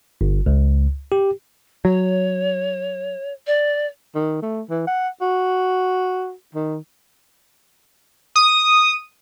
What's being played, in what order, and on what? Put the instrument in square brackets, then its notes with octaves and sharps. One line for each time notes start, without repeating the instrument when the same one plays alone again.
[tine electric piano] G1
C#2
G4
[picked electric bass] F#3 [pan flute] C#5
[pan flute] D5
[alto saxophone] D#3
A3
E3
F#5
F#4
D#3
[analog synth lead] D#6